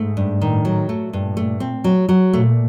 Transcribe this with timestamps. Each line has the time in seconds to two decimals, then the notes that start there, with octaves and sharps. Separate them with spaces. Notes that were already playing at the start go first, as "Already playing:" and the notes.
Already playing: G#2 A3
0.17 G2
0.41 A2 D#3
0.65 F#3
0.89 A#2 A3
1.13 G2
1.37 A3
1.60 C4
1.84 F#3
2.09 F#3
2.33 A#2 A3